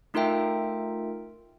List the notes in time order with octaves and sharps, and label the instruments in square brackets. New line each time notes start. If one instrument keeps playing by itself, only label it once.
[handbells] A3 D#4 F4 A#4 E5 G5